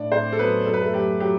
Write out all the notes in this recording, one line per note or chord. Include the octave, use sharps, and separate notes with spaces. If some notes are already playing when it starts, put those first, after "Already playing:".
Already playing: A2 D4 D5
A2 C4 C5
A4
F#3 B3 B4
F#2 A4
B4
A3 A4
F#3 G4
F#3 G4